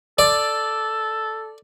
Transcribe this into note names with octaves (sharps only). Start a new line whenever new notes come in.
A4 D5